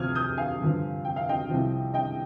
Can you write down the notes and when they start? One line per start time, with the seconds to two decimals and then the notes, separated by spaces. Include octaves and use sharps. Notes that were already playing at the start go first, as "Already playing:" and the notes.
Already playing: D2 C3 F3 D#6 F6 G#6
0.15 D#6 G6
0.37 F5 G#5
0.61 G2 D3 F3
1.05 G5
1.16 F5
1.29 D#5 G5
1.49 C2 C3 F3
1.94 D#5 G5